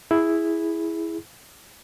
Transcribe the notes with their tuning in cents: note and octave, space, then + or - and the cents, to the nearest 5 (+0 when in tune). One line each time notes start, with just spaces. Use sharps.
E4 +0 G#4 +0